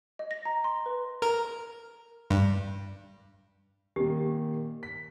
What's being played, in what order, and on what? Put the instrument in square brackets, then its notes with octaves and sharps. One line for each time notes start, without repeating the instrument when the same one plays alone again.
[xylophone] D#5
A#6
A#5
C6
B4
[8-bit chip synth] A#4
G2
[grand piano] A#2 D#3 [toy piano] G4
[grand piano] B6